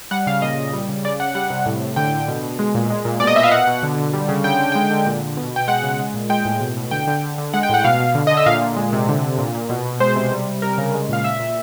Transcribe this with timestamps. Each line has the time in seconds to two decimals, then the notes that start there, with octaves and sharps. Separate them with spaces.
0.11 G3 F#5
0.27 C#3 F5
0.42 A#2 D#5
0.58 A#2
0.73 G3
0.89 C#3
1.04 C#3 D5
1.20 C#3 F#5
1.35 G3 F#5
1.50 C3
1.66 A2
1.82 A2
1.96 D3 G5
2.13 D3
2.28 B2
2.43 B2
2.59 G#3
2.75 A#2
2.90 G#3
3.05 A#2
3.20 B2 D5
3.27 D#5
3.35 B2 E5
3.43 F5
3.52 B2 F#5
3.67 B2
3.83 D3
3.98 D3
4.13 G3
4.29 C#3
4.44 D3 G5
4.60 D3
4.72 G#3 G5
4.91 D3
5.06 A#2
5.22 A#2
5.37 B2
5.52 B2 G5
5.68 G#3 F#5
5.83 C#3
5.99 G#3
6.14 A#2
6.29 G#3 G5
6.45 A2
6.61 B2
6.77 B2
6.91 D3 G5
7.07 D3
7.23 D3
7.38 D3
7.54 G#3 F#5
7.63 G5
7.69 A2 F#5
7.84 B2 F5
8.00 B2
8.15 D3
8.27 D3 D#5
8.37 E5
8.46 A#2 F5
8.62 A#2
8.77 G#3
8.93 C3
9.08 D3
9.23 D3
9.39 A#2
9.55 A#2
9.70 B2
9.85 B2
10.00 G#3 C5
10.16 C3
10.32 G3
10.47 C3
10.62 G3 A#4
10.78 C#3
10.94 G#3
11.09 A#2 F5
11.24 A#2 E5
11.40 A#2